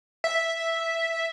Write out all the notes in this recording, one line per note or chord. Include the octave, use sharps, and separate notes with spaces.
E5